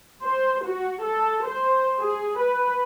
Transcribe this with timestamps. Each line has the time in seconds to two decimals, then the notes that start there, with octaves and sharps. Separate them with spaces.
0.23 C5
0.66 F#4
1.04 A4
1.48 C5
2.00 G#4
2.41 B4